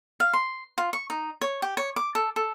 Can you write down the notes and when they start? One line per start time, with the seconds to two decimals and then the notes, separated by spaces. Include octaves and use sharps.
0.20 F5
0.33 C6
0.78 F4
0.93 C#6
1.10 D#4
1.41 C#5
1.62 G4
1.77 C#5
1.96 D6
2.15 A4
2.36 A4